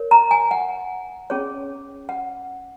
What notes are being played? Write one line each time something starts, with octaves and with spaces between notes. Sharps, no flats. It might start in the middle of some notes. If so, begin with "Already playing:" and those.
Already playing: A#4 C#5
A#5
G#5
F#5
C#4 G#4 C#5
F#5